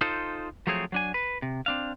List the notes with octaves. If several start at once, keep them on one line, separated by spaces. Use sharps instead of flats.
D#4 F4 A4 C5
F3 F#3 A3 C4 G#4 C#5
F#3 D4 G#5
B4
C3
C4 D4 F5